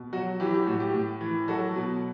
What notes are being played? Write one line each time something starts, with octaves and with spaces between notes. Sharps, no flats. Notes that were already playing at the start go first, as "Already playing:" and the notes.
Already playing: B2
F#3 F#4
E3 G4
G4
A2 F#4
G4
A2
E3
F#3 F#4 A4
B2